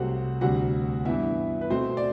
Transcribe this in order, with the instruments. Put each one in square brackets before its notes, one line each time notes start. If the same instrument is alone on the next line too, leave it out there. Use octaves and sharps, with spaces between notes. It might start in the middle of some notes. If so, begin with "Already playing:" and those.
Already playing: [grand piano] C2 C3 F#3 A3 C4 F#4 F#5
D2 C3 G3 F#4 F#5
G2 E3 B3 E4 E5
B4
B2 A3 C4 C5
D5